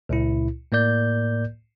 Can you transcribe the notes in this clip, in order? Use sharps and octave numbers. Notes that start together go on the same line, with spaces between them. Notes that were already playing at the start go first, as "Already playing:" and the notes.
C#2 A#2 E4
A2 A#3 A#4 D5 G6